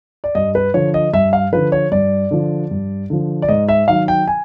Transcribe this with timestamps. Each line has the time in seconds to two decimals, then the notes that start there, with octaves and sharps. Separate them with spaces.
0.24 D5
0.35 G2 D#5
0.55 B4
0.74 D3 F3 C#5
0.94 D#5
1.13 G2 E5
1.33 F5
1.53 D3 F3 B4
1.72 C#5
1.92 G2 D5
2.31 D3 F3
2.71 G2
3.10 D3 F3
3.42 D5
3.49 G#2 D#5
3.69 E5
3.88 D#3 F#3 F5
4.08 G5
4.28 G#5